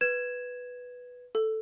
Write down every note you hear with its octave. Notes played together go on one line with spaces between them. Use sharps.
B4 G#6 E7
A4